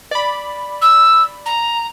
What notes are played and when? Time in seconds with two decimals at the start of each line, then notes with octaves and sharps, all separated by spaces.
0.11 D5 B5
0.82 E6
1.46 A#5